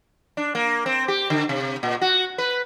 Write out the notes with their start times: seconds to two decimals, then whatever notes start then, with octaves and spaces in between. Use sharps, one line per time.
0.37 D4
0.55 A#3
0.86 C4
1.08 G4
1.30 D3
1.49 C3
1.83 A#2
2.01 F#4
2.38 B4